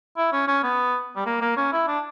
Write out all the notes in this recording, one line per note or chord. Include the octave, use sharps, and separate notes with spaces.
E4
C#4
C#4
B3
G3
A#3
A#3
C#4
E4
D4